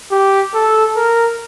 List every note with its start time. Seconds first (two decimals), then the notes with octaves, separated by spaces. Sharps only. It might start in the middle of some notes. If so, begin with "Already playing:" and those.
0.12 G4
0.54 A4
0.97 A#4